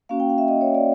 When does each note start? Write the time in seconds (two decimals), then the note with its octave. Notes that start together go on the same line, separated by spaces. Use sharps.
0.09 A#3 C#4 F#4 F5
0.20 G5
0.30 F5
0.38 E5
0.48 D#5
0.61 C#5
0.75 D5